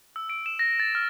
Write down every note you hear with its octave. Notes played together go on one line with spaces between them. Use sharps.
E6
D7
E7
A#6
A6
F6